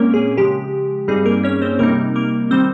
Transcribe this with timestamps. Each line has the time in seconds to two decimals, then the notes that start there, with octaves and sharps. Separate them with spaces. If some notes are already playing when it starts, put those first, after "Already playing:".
Already playing: A#2 G#3 A#3 C4 C#4 A#4 C#5
0.14 G#4
0.37 C#3 F3 G#3 G4
1.08 G2 G3 C4 D#4 G#4
1.26 A#3 A#4
1.43 C#4 C#5
1.61 C4 C5
1.79 C3 G3 A#3 C4 D#4 A#4
2.15 A#3 A#4
2.51 D#3 G3 C4 C5